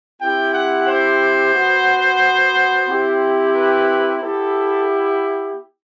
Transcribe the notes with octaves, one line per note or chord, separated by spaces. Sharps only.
C4 E4 G4 G5
F#5
C5
B3 F#4
C4 E4 G4
B4
B3 E4 G4 A4